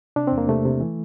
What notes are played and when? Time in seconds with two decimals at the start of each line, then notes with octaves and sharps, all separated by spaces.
0.16 C3 D4
0.27 C4
0.32 E2
0.38 A#3
0.48 C3 A3
0.65 C3
0.80 E3